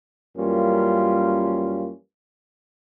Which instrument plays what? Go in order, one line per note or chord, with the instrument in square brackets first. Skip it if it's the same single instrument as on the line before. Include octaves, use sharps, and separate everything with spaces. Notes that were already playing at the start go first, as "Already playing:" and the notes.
[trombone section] F#2 E3 G3 A#3 C#4 F4